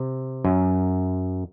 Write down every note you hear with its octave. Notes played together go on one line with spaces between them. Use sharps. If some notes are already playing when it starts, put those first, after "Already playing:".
Already playing: C3
F#2